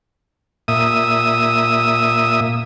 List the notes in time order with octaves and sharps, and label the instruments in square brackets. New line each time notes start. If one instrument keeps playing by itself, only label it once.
[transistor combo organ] A#2 E5 D#6